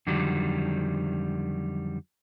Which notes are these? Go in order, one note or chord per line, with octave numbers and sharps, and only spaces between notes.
F2 D3 D#3 F#3 G3